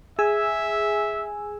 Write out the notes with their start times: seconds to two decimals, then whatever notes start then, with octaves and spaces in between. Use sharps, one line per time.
0.19 G#4 E5 G#5 E6